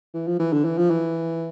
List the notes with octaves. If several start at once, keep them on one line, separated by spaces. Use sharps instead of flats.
E3
F3
E3
D3
E3
F3
E3